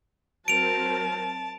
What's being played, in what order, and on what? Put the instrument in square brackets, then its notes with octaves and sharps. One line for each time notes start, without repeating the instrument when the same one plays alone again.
[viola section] F#3 C4 A#4 [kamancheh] A5 [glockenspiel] D7 F7